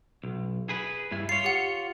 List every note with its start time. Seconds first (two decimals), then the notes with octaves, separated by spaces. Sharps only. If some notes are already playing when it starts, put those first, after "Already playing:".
0.23 B1
0.69 G#4 B4
1.12 G2 E4
1.29 F4 C#5 C7
1.44 G4 F#5